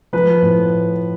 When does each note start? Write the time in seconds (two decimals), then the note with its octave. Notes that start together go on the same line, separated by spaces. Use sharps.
0.13 F3 B4
0.42 A2